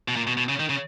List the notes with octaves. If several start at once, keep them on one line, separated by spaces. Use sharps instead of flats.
B2
A#2
B2
B2
C#3
D#3
C#3